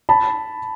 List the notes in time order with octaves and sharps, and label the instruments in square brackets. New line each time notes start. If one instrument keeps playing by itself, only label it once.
[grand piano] A5 B5